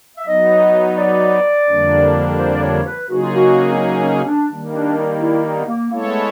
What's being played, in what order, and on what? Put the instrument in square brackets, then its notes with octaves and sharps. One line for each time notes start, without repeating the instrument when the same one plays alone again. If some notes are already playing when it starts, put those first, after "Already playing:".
[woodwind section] E5
[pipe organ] F#3 B3 D#4 [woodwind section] D#5
[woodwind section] D5
[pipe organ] F2 D3 G3 A#3 D4
[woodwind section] C5
D5
C#5
B4
[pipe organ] C#3 F#3 A#3 D#4 G#4 [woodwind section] F#4
[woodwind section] F4
F#4
C4
C#4
C#4
D4
[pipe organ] D#3 G3 A#3
[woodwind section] D4
D#4
E4
D#4
B3
A#3
[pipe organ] G#3 B3 E4 A4 C#5 [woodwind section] A#3
[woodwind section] A3